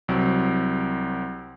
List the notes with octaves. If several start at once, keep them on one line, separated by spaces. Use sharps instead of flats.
C2 F#3 C4